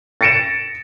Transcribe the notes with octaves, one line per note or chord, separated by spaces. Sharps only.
A6 A#6 C#7 D7 E7